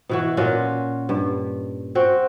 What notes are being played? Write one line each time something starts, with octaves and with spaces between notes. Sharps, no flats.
B2 E3 F#4
A#2 C#4 F4 F#4
G2
C4 F#4